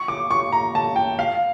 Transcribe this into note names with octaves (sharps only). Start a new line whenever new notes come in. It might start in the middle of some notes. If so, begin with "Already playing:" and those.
Already playing: C#6
D6
C#6
A#5
A5
G5
F5